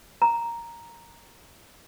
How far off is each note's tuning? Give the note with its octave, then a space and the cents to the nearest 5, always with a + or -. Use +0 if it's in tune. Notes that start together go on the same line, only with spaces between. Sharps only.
A#5 +0